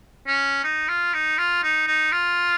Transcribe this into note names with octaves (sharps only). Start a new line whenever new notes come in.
C#4
D#4
F4
D#4
F4
D#4
D#4
F4